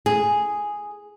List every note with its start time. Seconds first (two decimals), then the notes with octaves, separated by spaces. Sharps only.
0.06 G#4